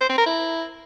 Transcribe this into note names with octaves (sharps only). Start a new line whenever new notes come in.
C5
C4
A#4
E4